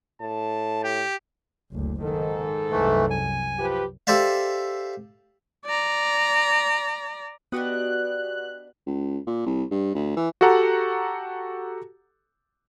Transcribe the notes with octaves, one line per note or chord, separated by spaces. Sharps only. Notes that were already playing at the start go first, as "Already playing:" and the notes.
A2 A5
G4
F#1 D2
G#2 D#3 A4
C2 F#2 E3 A3
G#5
F3 G4 B4
G4 A4 C5 D5 E5 F5
D5 A#5
B3 D4 F#4 G4 B4 D#5 F#6
C#2
A#2
C2
G2
D2
E3
F#4 G4 A4 F#5 A#5